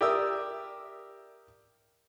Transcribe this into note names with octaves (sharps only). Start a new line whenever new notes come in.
G4 A#4 D5 E5 D#6 E6